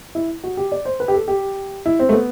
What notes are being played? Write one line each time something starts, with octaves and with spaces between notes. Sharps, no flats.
E4
F#4
G4
D5
C5
B4
G4
A4
G4
E4
C4
A3
B3